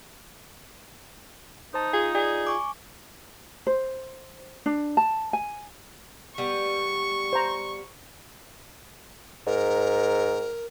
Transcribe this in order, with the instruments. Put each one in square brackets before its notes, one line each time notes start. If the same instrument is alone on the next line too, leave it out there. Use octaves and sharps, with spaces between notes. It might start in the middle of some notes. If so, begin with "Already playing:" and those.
[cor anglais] D#4 [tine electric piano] C5 A5
[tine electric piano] F4 [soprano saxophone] G#4
[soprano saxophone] G#4 [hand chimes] D5
[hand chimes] G#5 C#6 D6
[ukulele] C5
D4
A5
G#5
[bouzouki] G3 B3 [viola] C#6
[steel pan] C5 A#5
[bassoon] G#2 [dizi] A#4